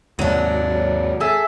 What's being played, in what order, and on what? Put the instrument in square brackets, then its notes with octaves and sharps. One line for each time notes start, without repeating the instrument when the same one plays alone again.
[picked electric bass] D#2 G#2 C3 [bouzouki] F#3 D4
[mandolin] G#4 A4 E5